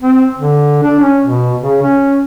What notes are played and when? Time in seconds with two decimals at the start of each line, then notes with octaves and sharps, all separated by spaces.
0.02 C4
0.38 D3
0.83 D4
1.00 C#4
1.23 B2
1.59 C#3
1.83 C#4